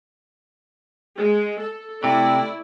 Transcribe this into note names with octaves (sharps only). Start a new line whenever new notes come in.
G#3
A4
C3 A3 E4 D5